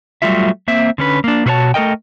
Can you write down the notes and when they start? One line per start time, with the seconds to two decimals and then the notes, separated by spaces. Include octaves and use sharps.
0.22 F#3 G3 A3 F4 E5
0.68 A#3 C4 E5
0.98 D3 C#4 B4
1.24 A#3 D4
1.46 B2 E4 F#4 C5 C#5 A5
1.74 A3 A4 A#4 D#5 G5